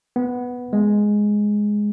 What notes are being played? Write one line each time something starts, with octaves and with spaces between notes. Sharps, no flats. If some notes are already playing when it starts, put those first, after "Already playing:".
B3
G#3